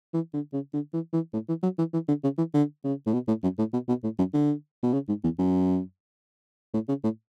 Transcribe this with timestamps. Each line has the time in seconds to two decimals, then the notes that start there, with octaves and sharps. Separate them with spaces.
0.14 E3
0.34 D3
0.53 C#3
0.73 D3
0.93 E3
1.13 E3
1.33 A2
1.48 E3
1.63 F#3
1.78 E3
1.93 E3
2.08 D3
2.23 C#3
2.38 E3
2.53 D3
2.84 C#3
3.06 A2
3.13 B2
3.28 A2
3.43 F#2
3.58 A2
3.73 B2
3.88 B2
4.03 A2
4.18 F#2
4.33 D3
4.83 B2
4.93 C#3
5.08 G#2
5.23 E2
5.38 F#2
6.74 A2
6.88 C#3
7.03 A2